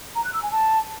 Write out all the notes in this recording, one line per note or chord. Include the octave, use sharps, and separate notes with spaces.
A#5
F#6
E6
G#5
A5